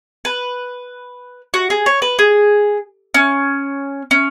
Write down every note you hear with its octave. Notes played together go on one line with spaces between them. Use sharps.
B4
F#4
G#4
C#5
B4
G#4
C#4
C#4